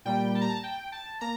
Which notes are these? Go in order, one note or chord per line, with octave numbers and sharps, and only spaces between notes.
A#2 G3 A#3 G5
A5
A#5
A5
G5
A5
A#3 A#5